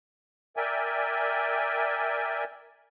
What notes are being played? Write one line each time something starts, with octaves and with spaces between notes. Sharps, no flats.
A#4 D5 E5 G5 G#5